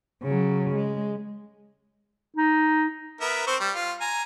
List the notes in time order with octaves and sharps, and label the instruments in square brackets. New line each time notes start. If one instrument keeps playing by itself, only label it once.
[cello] C#3 F#3
G#3
[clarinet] D#4
[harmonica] B3 A#4 E5
C4 C5 C#6
G3
F4
G#5 A#5